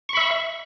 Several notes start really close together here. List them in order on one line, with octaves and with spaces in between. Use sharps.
C#6 B5 E5